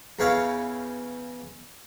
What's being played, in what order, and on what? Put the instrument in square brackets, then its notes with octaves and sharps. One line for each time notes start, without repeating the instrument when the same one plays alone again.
[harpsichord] E2 C#3 E4 C#5 F5 D6